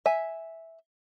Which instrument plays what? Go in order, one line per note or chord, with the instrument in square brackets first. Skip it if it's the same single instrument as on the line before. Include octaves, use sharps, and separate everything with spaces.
[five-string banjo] E5 G#5